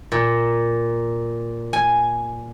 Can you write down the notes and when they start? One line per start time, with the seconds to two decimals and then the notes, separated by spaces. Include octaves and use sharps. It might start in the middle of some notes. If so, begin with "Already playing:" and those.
0.12 A#2
1.73 G#5